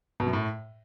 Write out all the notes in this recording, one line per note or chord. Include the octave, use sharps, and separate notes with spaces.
B2
F#2
A2